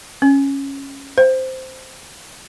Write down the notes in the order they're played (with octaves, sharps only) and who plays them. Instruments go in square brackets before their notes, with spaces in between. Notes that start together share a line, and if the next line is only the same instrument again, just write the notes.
[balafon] C#4
C5